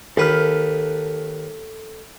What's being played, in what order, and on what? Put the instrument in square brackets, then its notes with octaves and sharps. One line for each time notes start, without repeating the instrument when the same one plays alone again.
[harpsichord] D#2 B4 [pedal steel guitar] A4 F6